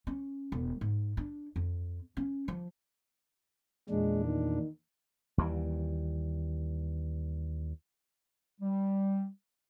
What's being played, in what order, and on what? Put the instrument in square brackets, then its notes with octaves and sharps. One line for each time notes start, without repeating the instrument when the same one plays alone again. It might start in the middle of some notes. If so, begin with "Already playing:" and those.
[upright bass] C#4
E1
G#2
D4
F2
C#4
F3
[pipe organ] E2 A#2 D4 [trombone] G#3
[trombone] D#3
[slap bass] D#2 E3 G3
[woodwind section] G3